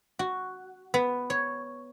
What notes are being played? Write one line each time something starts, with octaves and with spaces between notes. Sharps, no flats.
F#4
B3
C#5